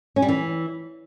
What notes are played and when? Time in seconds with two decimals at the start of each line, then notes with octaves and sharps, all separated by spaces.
0.16 C#4
0.22 G3
0.29 E3